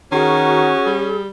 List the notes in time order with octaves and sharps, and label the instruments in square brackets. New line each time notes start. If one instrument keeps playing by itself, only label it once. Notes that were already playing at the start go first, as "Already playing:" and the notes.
[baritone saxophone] D#3 [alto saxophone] C#4 [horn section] F#4 [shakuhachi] G#4
[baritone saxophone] G3